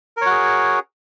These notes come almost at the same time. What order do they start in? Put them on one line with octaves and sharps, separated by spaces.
A#4 C#5 F#4 G#4